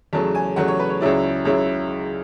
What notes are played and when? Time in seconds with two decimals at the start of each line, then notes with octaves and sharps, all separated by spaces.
0.13 E2 C#3 F#3 A3 A5
0.35 G#5
0.56 E2 C#3 F#3 A3 F#5
0.68 C#5
0.79 B4
0.90 C#5
1.01 C#2 C#3 F#3 C#4 E4 D5
1.45 C#2 C#3 F#3 C#4 E4